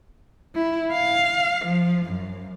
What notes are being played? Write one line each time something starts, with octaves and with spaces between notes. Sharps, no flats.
E4
F5
F3
F#2